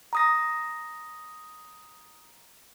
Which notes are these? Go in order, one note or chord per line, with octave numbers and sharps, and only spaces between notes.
A#5 D#6 A#6